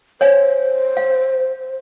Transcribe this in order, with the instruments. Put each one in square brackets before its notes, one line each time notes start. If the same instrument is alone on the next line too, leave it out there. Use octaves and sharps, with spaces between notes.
[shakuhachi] C5 [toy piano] C#5 F5 G#5
[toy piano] F5